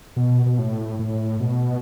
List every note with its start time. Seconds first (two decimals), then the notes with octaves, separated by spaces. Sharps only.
0.16 B2
0.46 B2
0.58 A2
0.99 A2
1.40 B2